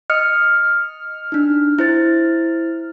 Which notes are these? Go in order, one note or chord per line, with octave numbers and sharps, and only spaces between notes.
D#5 D#6 F6 C#7
D4 D#4
E4 C5 A6